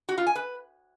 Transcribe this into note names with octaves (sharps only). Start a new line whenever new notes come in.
F#4
F4
G#5
B4